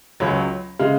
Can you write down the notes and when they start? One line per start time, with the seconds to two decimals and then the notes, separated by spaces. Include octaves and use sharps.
0.20 C#2 C#3 F#3 C#5
0.79 C#3 G#3 F5